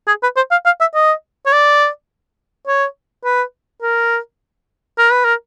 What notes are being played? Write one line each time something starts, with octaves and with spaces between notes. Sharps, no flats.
G#4
B4
C5
F5
F5
E5
D#5
C#5
D5
C#5
B4
A#4
A#4
B4
A#4